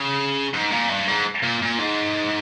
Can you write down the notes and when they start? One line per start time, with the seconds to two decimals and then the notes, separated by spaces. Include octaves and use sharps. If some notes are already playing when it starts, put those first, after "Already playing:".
Already playing: C#3
0.54 G#2
0.71 A#2
0.90 G2
1.08 G#2
1.43 A#2
1.62 A#2
1.79 G#2